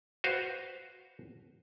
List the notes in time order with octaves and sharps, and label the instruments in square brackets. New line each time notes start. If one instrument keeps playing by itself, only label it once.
[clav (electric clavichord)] F#4 B4 C5 F5